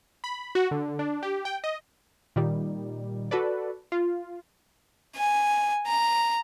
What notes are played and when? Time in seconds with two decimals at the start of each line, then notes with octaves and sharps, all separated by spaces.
0.24 B5
0.55 F#4
0.71 D3
0.99 D4
1.23 G4
1.45 G5
1.64 D#5
2.36 A#2 D#3 G3
3.31 F#4 A4 B4 D5
3.92 F4
5.16 G#5
5.87 A#5